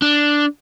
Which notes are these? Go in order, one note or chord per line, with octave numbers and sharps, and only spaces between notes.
D4